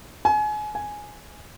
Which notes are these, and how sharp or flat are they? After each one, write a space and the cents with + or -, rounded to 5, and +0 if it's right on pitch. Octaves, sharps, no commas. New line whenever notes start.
G#5 +30
G#5 +0